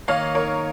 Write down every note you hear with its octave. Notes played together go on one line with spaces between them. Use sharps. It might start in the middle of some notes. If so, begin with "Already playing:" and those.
D#3 A#3 D#4 C#5 F5
A#4 C#5